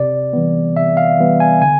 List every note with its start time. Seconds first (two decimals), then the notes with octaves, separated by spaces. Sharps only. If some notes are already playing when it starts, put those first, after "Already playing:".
Already playing: C3 D5
0.33 E3 G3 B3
0.76 C3 E5
0.97 F5
1.19 E3 G3 B3
1.40 G#5
1.62 D3 G#5